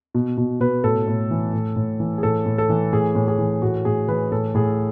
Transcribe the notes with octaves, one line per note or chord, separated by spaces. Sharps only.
B2
B2
B2 B4
A2 A4
A2
E3
A2
A2
E3
G#4
A2 A4
A2
A4
E3
A2 G#4
A2
G#4
E3
A2 F#4
A2 G#4
E3 B4
A2 A4
A2 G#4